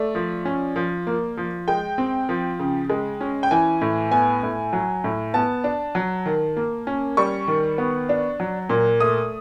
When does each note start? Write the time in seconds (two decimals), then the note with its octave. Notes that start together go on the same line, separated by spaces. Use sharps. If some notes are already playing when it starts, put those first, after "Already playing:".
Already playing: A3 D5
0.15 F3
0.45 C#4
0.76 F3
1.07 A#3
1.37 F3
1.68 G#3 G5
1.98 C4
2.29 F3
2.59 C#3
2.90 G#3
3.21 C#4
3.43 G5
3.51 E3 G#5
3.81 A2
4.11 B3 G#5
4.43 A2
4.73 F#3
5.04 A2
5.34 B3 A5
5.64 D4
5.95 F#3
6.26 D#3
6.57 A#3
6.87 C#4
7.17 G3 C#6
7.48 D#3
7.78 B3
8.09 D4
8.40 F#3
8.70 A#2
9.00 A3 D#6